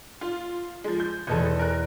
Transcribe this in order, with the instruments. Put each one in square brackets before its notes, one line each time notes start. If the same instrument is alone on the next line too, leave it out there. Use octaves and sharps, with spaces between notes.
[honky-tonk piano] F4
F3 G#3
G6
[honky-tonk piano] F1 A4 [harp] E2 B2 G#6
[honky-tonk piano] A#4 F#6